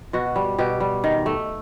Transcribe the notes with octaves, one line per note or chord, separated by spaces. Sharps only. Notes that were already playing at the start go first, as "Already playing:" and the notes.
B2 F#4
G3
B2 G4
G3
D#3
A3